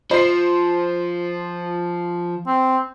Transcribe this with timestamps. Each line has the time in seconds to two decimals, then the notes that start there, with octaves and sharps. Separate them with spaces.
0.11 F3 C5 C7
2.47 C4